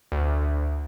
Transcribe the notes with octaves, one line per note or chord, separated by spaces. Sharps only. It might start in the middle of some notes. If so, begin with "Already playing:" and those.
D2